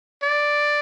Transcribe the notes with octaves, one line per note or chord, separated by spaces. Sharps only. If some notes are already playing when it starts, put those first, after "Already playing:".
D5